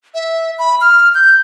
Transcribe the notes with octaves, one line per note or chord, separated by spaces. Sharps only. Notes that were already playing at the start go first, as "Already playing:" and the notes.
E5
B5
F6
G6